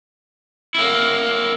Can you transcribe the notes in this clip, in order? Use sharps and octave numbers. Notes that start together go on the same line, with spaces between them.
A#3 E4